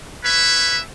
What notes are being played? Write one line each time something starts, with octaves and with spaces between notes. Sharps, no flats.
B4 C#5 E5